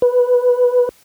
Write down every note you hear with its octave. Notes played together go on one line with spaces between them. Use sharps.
B4